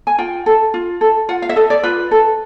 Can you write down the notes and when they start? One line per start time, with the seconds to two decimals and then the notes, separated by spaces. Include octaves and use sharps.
0.07 G#5
0.18 F4 G5
0.46 A4
0.74 F4
1.01 A4
1.29 F4 F#5
1.42 F5
1.49 E5
1.56 A4 D#5
1.70 D5
1.83 F4 B4
2.11 A4